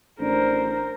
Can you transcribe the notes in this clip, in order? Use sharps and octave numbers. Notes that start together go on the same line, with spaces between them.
A1 D4 A#4 C5